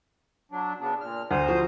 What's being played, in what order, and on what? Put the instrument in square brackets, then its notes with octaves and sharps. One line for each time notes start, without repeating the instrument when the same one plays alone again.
[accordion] F#3 D4
C#3 B3 D4
A#2 F6
[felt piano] D2 [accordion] C5 A#5 D#6
[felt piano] F3 F#4